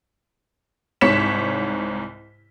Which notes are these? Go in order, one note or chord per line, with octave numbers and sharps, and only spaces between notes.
C2 G#2 C#5 B6 C#7 E7